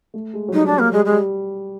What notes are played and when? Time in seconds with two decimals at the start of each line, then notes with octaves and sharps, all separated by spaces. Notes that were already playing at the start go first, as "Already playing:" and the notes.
0.14 A3
0.34 G#3
0.48 F#3
0.53 G3 D#4
0.66 D4
0.78 A#3
0.92 G3 G#3
1.05 G#3
1.11 G3